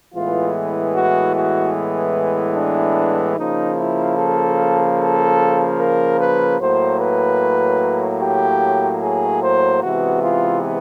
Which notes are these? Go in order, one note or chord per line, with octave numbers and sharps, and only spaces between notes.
A2 E3 G#3 B3 F4
F#4
F#4
D4
C#3 F3 A#3 D#4
E4
A4
A4
A#4
B4
A2 F#3 A#3 C5
B4
G4
G#4
C5
C3 E3 G#3 B3 F#4
F4